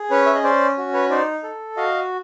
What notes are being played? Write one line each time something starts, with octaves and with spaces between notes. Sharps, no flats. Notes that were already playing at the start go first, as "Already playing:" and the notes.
Already playing: G#4
C#4 B4 C#5
E5
D#5
C#4 C5 D5
F#4
B4 C#5
D#4 C5 D5
A4
F#4 D#5 F5